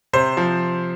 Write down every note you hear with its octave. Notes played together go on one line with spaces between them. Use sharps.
C3 C5
F3